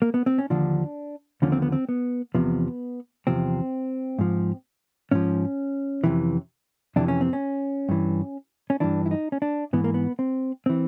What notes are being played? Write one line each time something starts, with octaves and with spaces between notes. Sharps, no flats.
A#3
B3
C4
C#4
D#2 D3 F3 D4
D#2 D3 F3 C#4
C4
B3
C4
B3
E2 C3 F3 B3
E2 C3 F3 C4
G#2 F3
G#2 F3 C#4
F2 C3 E3
F2 C3 E3 D4
C#4
C4
C#4
G2 E3
C#4
G2 E3 D4
E4
D#4
C#4
D4
G#2 E3 B3
A#3
B3
C4
E3 C4